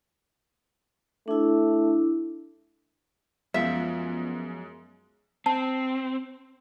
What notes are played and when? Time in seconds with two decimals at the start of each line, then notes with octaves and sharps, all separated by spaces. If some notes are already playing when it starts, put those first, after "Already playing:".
1.28 A3 D4 E4
3.54 F#2 F3 G#3 B3 F4 E5
5.46 C4 A5